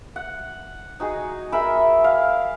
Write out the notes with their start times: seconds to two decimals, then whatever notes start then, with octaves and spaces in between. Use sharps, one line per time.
0.16 F#5
1.00 D#4 F#4 G#4
1.52 G#4 A#4 E5 B5
2.04 F5